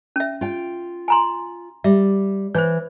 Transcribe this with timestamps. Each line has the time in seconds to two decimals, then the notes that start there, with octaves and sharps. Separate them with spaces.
0.16 C#4 E5
0.41 F4 G5
1.08 G#5 A#5 C6
1.84 G3 E5
2.55 E3 C5 C#5